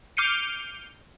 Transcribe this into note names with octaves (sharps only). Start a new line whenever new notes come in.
D6 F6 G6 C7 C#7 D#7